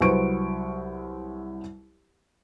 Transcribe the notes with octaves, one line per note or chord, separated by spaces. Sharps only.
C2 F#3 B4 C5 C#6 D7